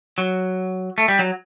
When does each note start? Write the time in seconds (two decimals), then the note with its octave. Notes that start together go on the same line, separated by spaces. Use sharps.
0.18 F#3
0.98 A3
1.08 G3
1.19 F#3